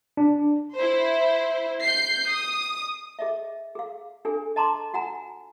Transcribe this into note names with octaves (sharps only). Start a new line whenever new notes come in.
D4
E4 C5
G6 C7
D#6
G#4 D#5 E5
G#4 F5
D4 G#4 A4 G#5
D#5 A5 A#5 C6 D6
F#4 F#5 G#5 A#5